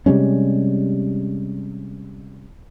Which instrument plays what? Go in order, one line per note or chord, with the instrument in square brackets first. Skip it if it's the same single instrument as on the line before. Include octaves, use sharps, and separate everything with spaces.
[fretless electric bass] C3 G3 G#3 C#4